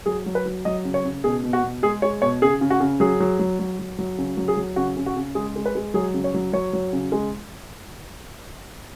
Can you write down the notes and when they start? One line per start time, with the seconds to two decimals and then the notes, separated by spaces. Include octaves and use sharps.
0.06 F#3 G#4
0.26 F#3
0.35 B4
0.46 F#3
0.65 F#3 D#5
0.85 C#3
0.94 C#5
1.05 C#3
1.24 B2 G#4
1.44 B2
1.53 F#4
1.63 B2
1.83 G#3 G#4
2.02 G#3 C#5
2.22 B2 C#5
2.42 C#3 G#4
2.61 C#3
2.70 F#4
2.80 C#3
3.00 F#3 G#4
3.20 F#3
3.39 F#3
3.59 F#3
3.79 F#3
3.99 F#3
4.18 C#3
4.37 F#3
4.48 G#4
4.57 F#3
4.76 C#3 F#4
4.97 C#3
5.06 F#4
5.17 C#3
5.35 G#3 G#4
5.56 G#3
5.66 B4
5.75 G#3
5.94 F#3 G#4
6.14 C#3
6.24 C#5
6.34 F#3
6.53 F#3 C#5
6.73 F#3
6.93 C#3
7.12 G#3